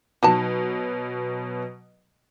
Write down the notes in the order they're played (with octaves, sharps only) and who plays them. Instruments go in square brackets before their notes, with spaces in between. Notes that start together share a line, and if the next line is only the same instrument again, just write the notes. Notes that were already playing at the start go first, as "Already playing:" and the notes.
[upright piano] B2 F#3 [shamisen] D#4 F#4 A5